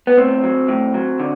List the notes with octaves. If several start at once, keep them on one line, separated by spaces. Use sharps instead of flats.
B3
A2 C4
F#3
A2
F#3
D3